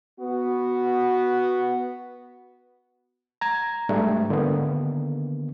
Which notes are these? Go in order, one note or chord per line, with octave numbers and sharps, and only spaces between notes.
B3 F#4
A#5 G#6
G#2 G3 A3 D4
D3 D#3 A#3 B3